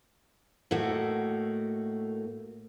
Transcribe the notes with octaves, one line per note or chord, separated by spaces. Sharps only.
A2 A3 A#3 D#4 F#4